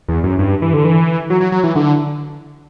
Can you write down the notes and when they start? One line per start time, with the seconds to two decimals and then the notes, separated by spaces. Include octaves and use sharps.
0.08 E2
0.24 F#2
0.39 G2
0.62 E3
0.73 D3
0.85 E3
1.30 F#3
1.40 F#3
1.52 F#3
1.63 E3
1.75 D3